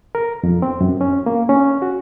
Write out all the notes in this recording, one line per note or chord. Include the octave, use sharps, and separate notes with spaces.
A#4
F2
C4
F#2
C#4
A#3
C#4
F#4